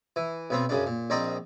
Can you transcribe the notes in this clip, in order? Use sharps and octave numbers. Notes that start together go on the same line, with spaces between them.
E3
B1 B3 C4
F#2 C#3 D4
A#2
A#1 C4 A#4 D5 D#5